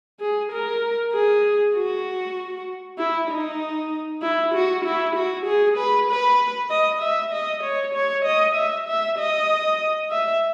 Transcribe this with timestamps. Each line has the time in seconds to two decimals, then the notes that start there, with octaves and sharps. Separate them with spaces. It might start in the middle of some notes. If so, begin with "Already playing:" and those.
0.20 G#4
0.52 A#4
1.13 G#4
1.75 F#4
2.98 E4
3.30 D#4
4.22 E4
4.54 F#4
4.85 E4
5.16 F#4
5.46 G#4
5.77 B4
6.09 B4
6.70 D#5
7.01 E5
7.32 D#5
7.63 C#5
7.94 C#5
8.25 D#5
8.55 E5
8.87 E5
9.18 D#5
10.11 E5